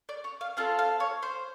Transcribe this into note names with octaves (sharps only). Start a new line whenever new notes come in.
D5
C#5
F5
C4 F4 A4 F5
F5
C#5
C5